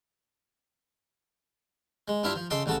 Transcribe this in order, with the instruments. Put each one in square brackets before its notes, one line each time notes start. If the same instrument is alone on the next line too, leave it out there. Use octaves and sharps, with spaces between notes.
[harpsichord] G#3
G2 D4 E4 F4 E5
F3
C#3 A4 D#5 C6 D6
A1 C#3 F#4 A4 A5